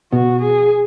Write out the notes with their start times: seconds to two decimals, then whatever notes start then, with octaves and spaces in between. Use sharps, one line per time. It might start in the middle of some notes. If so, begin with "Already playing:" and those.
0.12 B2 B3 F#4
0.41 G#4